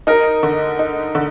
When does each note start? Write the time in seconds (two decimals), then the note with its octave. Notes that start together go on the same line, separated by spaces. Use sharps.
0.07 D#4 A#4
0.43 D3
0.79 D#4
1.15 D3